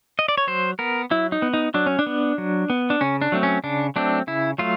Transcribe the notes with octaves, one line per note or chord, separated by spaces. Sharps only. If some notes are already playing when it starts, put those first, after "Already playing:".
D#5
D5
C#5
F#3 C5
B3 A#4
F#3 E4
D#4
B3
D#4
F#3 D4
C#4
D4
B3
F#3
B3
D4
C#3 C#4
D4
F#3 A3 C4
C#4
C#3 D4
F#3 A3 C4 D4
C#3 E4
F#3 A3 F4